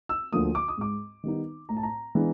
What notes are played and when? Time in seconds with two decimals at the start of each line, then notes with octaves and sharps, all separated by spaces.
0.09 E6
0.32 D2 D3 F3 A#3 D#6
0.55 D6
0.68 D#6
0.78 G#2 D6
1.23 D#3 G3 B3 D#4
1.69 A2 A#5
1.77 A5
1.83 A#5
2.15 E3 G#3 B3 D4